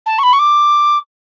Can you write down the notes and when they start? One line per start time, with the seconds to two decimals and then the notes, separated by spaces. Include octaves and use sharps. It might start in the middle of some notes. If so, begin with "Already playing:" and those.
0.06 A5
0.18 C#6
0.23 B5
0.33 C#6
0.39 D6